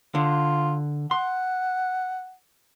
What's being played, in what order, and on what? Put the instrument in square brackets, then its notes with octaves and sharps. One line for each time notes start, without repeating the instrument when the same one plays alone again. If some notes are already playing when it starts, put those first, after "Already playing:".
[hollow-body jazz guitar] D3 [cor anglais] F4
[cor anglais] F#5 [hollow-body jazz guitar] C6